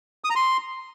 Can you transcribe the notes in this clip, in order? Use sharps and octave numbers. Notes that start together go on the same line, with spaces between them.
D#6
A#5
C6